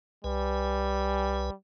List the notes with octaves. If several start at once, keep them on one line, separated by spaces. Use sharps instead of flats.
C2 G3 B4 G#5